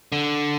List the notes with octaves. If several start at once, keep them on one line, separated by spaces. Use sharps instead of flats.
D3